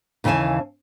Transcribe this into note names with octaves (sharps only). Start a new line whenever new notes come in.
D#2 C#3 E3 F5 G#5 A5